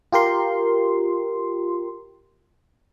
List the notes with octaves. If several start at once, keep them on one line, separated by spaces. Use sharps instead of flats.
F4 G4 A#4 C6